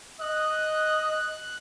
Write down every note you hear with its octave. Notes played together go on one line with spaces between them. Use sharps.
D#5 F#6